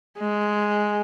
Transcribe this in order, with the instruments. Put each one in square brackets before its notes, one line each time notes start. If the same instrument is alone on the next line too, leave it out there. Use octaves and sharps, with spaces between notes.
[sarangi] G#3